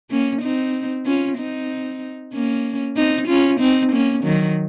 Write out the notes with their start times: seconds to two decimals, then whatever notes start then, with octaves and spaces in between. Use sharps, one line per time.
0.11 A#3 C#4
0.42 C4 D#4
1.06 C#4 F4
1.38 C4 D#4
2.33 A#3 C#4
2.96 C4 D#4
3.28 C#4 F4
3.60 C4 D#4
3.92 A#3 C#4
4.24 D#3 F#3